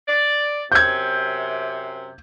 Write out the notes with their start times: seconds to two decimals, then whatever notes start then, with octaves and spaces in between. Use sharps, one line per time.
0.07 D5
0.72 F#2 C3 G6 G#6